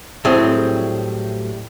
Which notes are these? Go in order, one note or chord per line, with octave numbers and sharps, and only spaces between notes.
A2 F#3 G3 C4 G#4